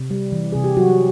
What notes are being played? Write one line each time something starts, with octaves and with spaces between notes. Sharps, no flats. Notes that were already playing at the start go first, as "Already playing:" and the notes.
Already playing: C3
G3
E3
C3 G#4
G4
F#3 F#4